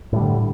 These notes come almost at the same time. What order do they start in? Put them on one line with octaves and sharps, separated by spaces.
A2 G3 D3